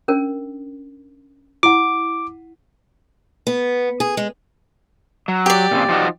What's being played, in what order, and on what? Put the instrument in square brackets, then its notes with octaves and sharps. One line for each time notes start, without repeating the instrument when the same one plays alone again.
[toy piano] C#4 D4 A#4
[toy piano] E4 F#5 [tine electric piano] D6
[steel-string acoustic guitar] B3
G#4
G#3
[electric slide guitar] F#3
[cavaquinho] G4 D5
[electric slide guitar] A#2 C#3 C4
F3 D#4 F#4